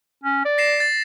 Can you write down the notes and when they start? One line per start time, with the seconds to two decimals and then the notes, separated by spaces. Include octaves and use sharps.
0.24 C#4
0.45 D5
0.58 A#6 C7 E7
0.80 A6